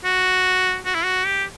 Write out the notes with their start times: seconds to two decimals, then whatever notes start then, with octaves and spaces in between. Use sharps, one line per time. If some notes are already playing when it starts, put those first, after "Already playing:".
0.05 F#4
0.85 F#4
0.94 E4
1.04 F#4
1.26 G4